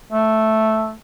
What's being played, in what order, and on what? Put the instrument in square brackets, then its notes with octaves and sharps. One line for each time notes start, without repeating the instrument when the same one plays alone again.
[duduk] A3